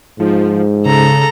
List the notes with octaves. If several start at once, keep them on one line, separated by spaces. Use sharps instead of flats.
G#2 F3
C#3 A4 A#5